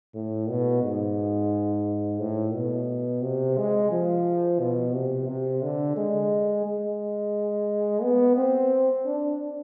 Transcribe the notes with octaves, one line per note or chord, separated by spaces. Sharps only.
A2
B2
G#2
A2
B2
C3
G#3
F3
B2
C3
C3
D3
G#3
G#3
B3
C4
D4